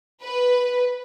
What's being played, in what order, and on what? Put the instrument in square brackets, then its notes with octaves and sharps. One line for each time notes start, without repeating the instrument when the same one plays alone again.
[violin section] B4